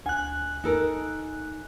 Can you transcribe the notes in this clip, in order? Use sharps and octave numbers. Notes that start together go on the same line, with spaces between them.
D2 G#5 F#6
D#4 A4 A#4